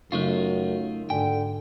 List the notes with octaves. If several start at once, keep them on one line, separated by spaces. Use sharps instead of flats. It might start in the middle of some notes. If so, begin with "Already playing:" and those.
F#2 C#3 F#3 A3 D#4 F4
G#2 D3 G5